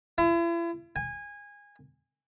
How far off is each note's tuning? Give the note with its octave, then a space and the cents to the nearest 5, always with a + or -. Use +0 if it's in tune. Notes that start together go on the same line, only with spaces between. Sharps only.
E4 +40
G#5 -20